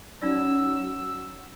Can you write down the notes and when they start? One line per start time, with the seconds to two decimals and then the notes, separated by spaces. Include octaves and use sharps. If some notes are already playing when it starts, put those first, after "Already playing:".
0.21 F#3 C#4 D#4 D5 E6